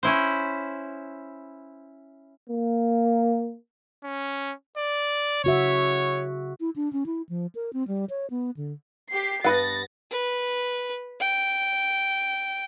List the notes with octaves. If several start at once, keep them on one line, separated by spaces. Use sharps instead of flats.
C#4 E4 C5
A#3
C#4
D5
C#3 F#4 C#5 E5
E4
D4
C#4
E4
F3
A#4
C4
G3
C#5
B3
D3
G4 C7
G2 B3 B4 F#5 A6 A#6
B4
G5